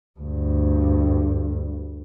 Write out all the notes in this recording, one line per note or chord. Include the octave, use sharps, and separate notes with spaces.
D2 G2